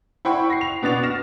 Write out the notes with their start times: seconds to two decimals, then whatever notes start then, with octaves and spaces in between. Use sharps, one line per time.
0.25 E4 C5 F#5 G5 B5 C#6
0.50 A#6 C7
0.61 F7
0.82 B2 B3 D4 A6 F7
1.03 F6 A#6 E7